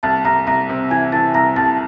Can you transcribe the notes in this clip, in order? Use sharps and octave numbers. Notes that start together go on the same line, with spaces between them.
C2 A5 A6
C2 A#5 A#6
C2 A#5 A#6
C3
E3 G#5 G#6
E3 A5 A6
C2 A#5 A#6
C2 A5 A6